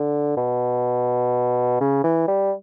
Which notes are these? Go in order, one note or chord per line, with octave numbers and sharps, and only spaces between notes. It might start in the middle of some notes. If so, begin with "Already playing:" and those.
Already playing: D3
B2
C#3
E3
G3